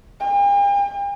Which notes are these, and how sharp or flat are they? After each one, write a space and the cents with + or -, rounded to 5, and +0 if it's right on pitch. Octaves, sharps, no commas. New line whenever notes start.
G5 +45